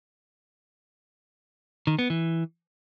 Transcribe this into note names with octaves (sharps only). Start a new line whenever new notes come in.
D#3
B3
E3